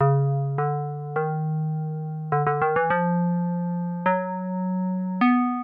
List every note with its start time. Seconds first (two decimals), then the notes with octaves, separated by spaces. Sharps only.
0.01 C#3
0.58 D3
1.16 D#3
2.32 D3
2.47 D3
2.62 D#3
2.76 E3
2.90 F3
4.06 F#3
5.21 B3